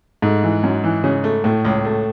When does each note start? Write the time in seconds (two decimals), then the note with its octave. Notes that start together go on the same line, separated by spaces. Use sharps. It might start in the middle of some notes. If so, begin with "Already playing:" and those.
0.22 G#2 A3
0.43 E3
0.64 F#2
0.84 E3
1.04 C#3
1.24 A3
1.44 A2 A3
1.65 C#2
1.85 A3